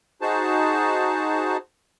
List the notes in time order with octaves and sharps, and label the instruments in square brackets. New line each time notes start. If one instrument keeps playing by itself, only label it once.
[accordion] D#4 F#4 G#4 C5 A5